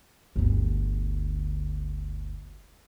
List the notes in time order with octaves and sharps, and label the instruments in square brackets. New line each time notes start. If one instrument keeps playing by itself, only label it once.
[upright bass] G1 D2